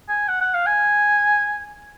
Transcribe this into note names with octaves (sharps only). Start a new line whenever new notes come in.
G#5
F#5
F#5
F5
G#5